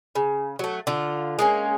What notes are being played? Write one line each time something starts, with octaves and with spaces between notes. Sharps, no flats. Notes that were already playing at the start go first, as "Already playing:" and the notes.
C#3
F#3 A3
D3 F4
G#3 A#3 C#4